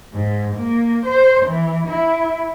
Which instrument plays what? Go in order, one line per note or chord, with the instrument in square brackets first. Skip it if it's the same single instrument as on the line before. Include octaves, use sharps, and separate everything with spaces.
[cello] G#2
A#3
C5
E3
E4